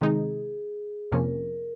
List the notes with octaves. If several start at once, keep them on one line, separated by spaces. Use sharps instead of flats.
C3 D#3 G#3 D#4 G#4
F2 C3 F3 A#3 C#4 A#4